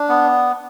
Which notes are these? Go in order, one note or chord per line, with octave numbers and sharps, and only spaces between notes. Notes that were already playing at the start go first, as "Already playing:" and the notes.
Already playing: D4
B3